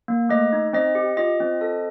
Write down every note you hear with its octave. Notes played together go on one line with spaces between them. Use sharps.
A#3
A3 D#5
D#4
C4 D#5
G4
F4 D#5
C4
A4